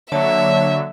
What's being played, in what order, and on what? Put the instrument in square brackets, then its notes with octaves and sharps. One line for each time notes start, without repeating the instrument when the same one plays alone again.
[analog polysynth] D3 F#3 [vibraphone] A#3 C#5 A5 [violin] E5